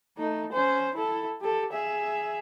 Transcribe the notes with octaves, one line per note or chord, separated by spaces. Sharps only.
A3 D#4
C#4 C5
E4 A4
G4 A4
G#4 E5